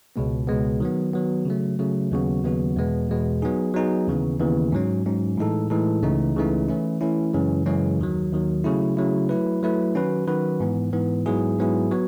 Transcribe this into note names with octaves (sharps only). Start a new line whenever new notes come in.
C#2 B2 G#3 B3
C#2 B2 G#3 B3
D#3 F#3 B3
D#3 F#3 B3
C#3 F#3 A3
C#3 F#3 A3
D#2 C#3 F#3 B3 F#4
D#2 C#3 F#3 B3 F#4
E2 B2 G#3 B3
E2 B2 G#3 B3
F#3 B3 D#4 G#4
F#3 B3 D#4 G#4
D#2 C#3 E3 B3
D#2 C#3 E3 B3
G#2 F#3 C#4
G#2 F#3 C#4
A2 E3 G#3 D#4 A4
A2 E3 G#3 D#4 A4
C#2 C#3 E3 A3 D#4
C#2 C#3 E3 A3 D#4
E3 A3 C#4 E4
E3 A3 C#4 E4
F#2 C#3 E3 G#3 C#4
F#2 C#3 E3 G#3 C#4
D#2 D#3 F#3
D#2 D#3 F#3
C#3 F#3 A3 E4
C#3 F#3 A3 E4
F#3 A3 E4 B4
F#3 A3 E4 B4
D#3 F#3 C#4 F#4 B4
D#3 F#3 C#4 F#4 B4
G#2 E3 B3
G#2 E3 B3
G#2 F#3 B3 E4 G#4
G#2 F#3 B3 E4 G#4
F#3 B3 F#4 C#5